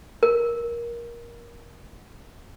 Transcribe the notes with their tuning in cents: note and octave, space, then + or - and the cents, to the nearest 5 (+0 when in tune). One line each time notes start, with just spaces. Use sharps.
A#4 +20